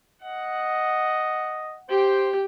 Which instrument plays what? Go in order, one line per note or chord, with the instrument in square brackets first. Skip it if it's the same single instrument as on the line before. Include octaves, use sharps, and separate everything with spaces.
[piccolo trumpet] D#5 [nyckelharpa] F#5
[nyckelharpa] G4 G5 [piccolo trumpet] C5